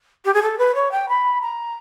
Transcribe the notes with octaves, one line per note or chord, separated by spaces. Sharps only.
G4
G#4
A4
B4
C#5
G5
B5
A#5